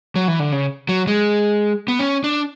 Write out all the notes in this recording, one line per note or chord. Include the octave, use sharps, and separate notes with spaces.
F#3
E3
D3
C#3
F#3
G#3
B3
C#4
D4